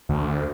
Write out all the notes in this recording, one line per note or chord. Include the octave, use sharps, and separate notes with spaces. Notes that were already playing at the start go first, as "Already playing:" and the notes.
D2